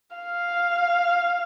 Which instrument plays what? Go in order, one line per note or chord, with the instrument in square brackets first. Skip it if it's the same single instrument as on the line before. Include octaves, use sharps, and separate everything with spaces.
[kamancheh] F5